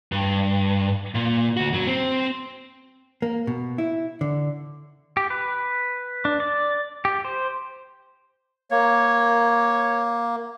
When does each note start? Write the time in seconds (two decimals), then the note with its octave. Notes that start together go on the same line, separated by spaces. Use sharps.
0.12 G2
1.15 A#2
1.57 D2 F#4
1.73 F#2 F#3
1.87 C4
3.22 A#3
3.47 B2
3.78 E4
4.21 D3
5.17 G4
5.30 B4
6.25 D4
6.40 D5
7.05 G4
7.25 C5
8.71 A#3 C#5